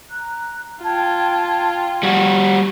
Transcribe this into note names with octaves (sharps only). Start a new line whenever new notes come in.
A#5 F#6
F4 G5 A5 G#6
G3 F#4